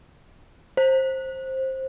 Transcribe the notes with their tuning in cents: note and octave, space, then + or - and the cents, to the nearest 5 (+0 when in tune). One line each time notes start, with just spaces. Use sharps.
C5 +15